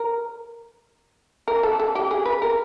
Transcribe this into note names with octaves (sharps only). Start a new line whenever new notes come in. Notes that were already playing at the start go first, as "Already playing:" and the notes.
Already playing: A#4
A#4
A4
A4
G4
G#4
B4
A#4